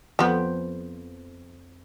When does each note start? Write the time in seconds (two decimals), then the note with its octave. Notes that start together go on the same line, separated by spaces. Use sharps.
0.19 F2 F3 B3 G5 B5